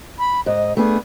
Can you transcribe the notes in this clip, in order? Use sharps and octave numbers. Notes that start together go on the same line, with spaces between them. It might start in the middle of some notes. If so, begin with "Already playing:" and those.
B5
G#2 D#5
A3 B3 D4 G#4